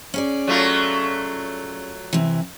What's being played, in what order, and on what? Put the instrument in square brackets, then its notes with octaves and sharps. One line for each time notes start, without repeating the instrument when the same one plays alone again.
[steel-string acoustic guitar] C#4 G#4 D5
[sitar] F#3 A3 F4
[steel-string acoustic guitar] C3 E3